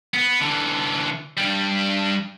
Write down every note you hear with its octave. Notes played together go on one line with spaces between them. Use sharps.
B3
D3 E3
G2 G3